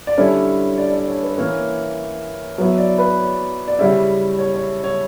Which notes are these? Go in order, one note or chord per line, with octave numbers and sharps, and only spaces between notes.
D5
D3 G3 C#4 E4 C#5
D5
D5
C#5
B4
E3 A#3 C#4 E4 C#5
F#3 B3 E4 C#5
D5
B4
C#5
D5
C#3 G3 C#4 E4 E5
C#5
C#5
C#5